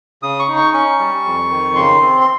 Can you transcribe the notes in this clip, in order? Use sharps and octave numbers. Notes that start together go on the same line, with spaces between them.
C#3 D#6
C#6
D#4
C#6
C#4 C#6
G3
F2
D#3
C#3 C6
C4
C6